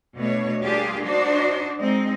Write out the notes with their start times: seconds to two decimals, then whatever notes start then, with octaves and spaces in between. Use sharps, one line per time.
0.16 B2 A3 D4 C#5
0.62 G3 A#3 D4 F4 G4 G#4
1.03 D4 D#4 F#4 C5
1.78 G#3 C4 D#4